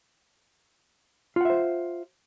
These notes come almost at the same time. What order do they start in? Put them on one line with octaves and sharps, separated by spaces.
F4 F#5 E5 C5